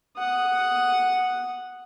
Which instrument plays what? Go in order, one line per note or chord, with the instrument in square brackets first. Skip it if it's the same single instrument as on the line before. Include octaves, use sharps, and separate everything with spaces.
[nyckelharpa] F#5 D#6